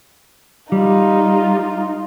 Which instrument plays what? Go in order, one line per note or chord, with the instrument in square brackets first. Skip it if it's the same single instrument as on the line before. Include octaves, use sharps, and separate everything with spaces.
[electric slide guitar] G3 [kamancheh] D#4 F4